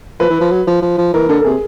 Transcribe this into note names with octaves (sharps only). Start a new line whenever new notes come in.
F3 B4
E3
F3
F#3
F3
F3
F3
E3 A#4
D3 A4
A4
C3 G#4